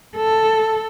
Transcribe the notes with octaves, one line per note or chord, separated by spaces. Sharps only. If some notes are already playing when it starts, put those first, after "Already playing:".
A4